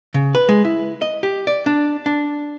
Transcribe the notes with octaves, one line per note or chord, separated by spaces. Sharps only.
C#3
B4
G#3
E4
D#5
G4
D5
D4
D4